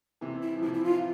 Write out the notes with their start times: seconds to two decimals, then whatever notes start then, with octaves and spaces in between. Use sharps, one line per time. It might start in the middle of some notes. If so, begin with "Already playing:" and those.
0.21 C3 E3
0.42 E4
0.57 F3
0.62 C3 E3 E4
0.74 E4
0.84 F4